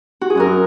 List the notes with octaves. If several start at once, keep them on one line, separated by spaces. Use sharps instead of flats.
F#4
G#4
F#2 F#4 A#4